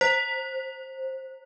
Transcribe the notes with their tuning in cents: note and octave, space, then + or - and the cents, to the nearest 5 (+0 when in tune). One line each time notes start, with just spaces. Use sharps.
C5 +15